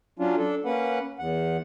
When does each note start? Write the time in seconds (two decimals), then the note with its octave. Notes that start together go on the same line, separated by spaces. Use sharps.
0.19 F#3 C#4 D4 F4
0.37 D4 A4
0.65 A#3 C#4 B4 F#5
1.19 E2 F#5